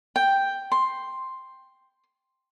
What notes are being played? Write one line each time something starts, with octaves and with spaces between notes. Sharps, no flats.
G5
C6